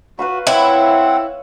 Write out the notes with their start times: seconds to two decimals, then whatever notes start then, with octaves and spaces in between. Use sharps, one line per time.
0.19 F#4 B4 F5 B5
0.47 C4 E4 C#5 F#5